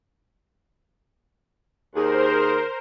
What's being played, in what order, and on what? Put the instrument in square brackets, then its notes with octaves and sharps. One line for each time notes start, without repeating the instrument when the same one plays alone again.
[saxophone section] D#2 G#4 [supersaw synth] A#4 C5